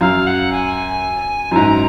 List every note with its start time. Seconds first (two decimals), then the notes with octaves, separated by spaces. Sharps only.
0.01 F#2 F5
0.27 F#5
0.52 G#5
1.51 F#2
1.56 G#2 A#5